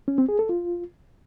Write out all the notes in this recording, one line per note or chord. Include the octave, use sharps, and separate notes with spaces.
C#4
C4
G#4
A4
F4